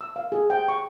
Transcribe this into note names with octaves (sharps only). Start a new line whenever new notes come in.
E6
F5
G#4
G5
C#6